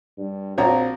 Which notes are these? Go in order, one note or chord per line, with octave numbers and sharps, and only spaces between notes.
G2
A#1 C4 F#4 C#5 A#5